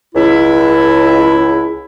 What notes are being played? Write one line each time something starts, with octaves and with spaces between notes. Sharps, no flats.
C#2 E4